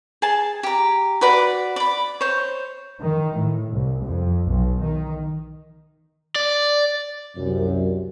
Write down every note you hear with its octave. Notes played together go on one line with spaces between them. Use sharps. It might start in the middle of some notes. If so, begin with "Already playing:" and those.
G#4 A5
G4 A#5
F#4 B4 D5 F#5
D5 B5
C5 C#5
D#3
A2
C2
F2
B1
D#3
D5
C2 F#2